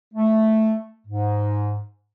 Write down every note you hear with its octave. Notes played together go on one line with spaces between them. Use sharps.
A3
G#2